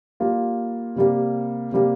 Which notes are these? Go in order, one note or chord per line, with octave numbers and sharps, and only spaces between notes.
G3 A#3 F4
C3 G3 A#3
C3 G3 A#3